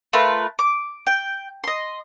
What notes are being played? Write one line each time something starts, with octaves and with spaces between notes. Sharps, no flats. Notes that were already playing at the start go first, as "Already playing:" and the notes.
A3 F4 A#4 B4
D6
G5
D#5 C6